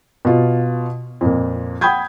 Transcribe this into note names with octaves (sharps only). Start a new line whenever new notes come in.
B2 F4
F2 A#2
F#5 G5 B5 D#6 G6 G#6